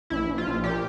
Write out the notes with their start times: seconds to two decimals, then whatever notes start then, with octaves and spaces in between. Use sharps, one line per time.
0.10 A#1 E4
0.29 A#1
0.38 F4
0.47 A#1
0.64 A#2 G4